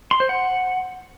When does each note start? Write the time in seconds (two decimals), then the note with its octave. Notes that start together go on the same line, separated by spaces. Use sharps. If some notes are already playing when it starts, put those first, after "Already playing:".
0.11 C6
0.20 C5
0.29 F#5